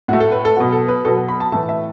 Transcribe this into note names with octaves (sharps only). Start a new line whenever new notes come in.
A2 A3 F#4
A4
B4
A4
B2 F#3 B3 F#4
A4
B4
B2 F#3 B3 A4
B4
B5
A5
A2 E3 A3 A5
E5